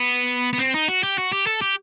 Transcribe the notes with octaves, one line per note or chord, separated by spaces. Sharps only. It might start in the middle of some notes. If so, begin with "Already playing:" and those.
Already playing: B3
B3
C4
D#4
F#4
G4
F#4
G4
A4
G4